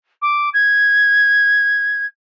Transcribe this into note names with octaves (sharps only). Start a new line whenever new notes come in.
D6
G#6